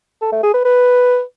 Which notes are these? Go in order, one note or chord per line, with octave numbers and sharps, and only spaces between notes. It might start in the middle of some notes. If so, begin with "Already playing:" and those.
A4
A3
G#4
B4
B4